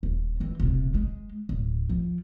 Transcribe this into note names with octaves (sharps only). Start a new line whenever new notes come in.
D#1
E3 C4
D#1 C3
G#3
D1
F3